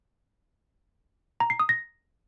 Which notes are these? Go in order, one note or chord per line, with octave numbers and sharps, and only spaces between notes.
A#5
C7
D#6
A#6